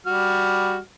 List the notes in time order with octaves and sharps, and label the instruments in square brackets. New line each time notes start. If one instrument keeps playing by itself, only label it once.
[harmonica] G3 F#4 F6